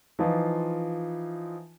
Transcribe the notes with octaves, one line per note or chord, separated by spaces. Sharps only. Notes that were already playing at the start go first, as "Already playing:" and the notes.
E3 F3 D#4 F4